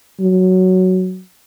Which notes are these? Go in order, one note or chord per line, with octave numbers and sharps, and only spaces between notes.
F#3